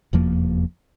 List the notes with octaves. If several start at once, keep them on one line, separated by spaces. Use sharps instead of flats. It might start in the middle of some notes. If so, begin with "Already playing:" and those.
F1 E2 F3 A#3